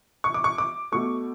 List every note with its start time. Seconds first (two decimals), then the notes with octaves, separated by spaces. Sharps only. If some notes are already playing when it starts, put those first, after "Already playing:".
0.24 C#6
0.34 D6
0.44 C#6
0.58 D6
0.92 B2 A3 C#6